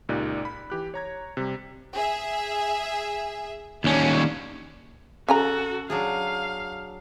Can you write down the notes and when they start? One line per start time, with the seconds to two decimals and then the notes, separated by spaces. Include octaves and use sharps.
0.09 C#2 A#2 D#4 G4 D5 F#6
0.45 B5
0.70 E3 G4 F#6
0.94 C#5 A#5 G#6
1.37 C3 G3
1.94 G#4 E5
3.84 D#2 C#4 D4
5.28 C#3 F#4 A4 G#5 A#5
5.90 F#3 D4 G#4 F5